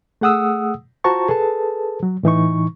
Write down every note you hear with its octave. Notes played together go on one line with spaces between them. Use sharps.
A3 G#4 F#5 D#6 E6
F4 F#4 C5 A5 A#5 C#6
G#4 A4 B4 A5
F#3
A2 E3 D#4 C#6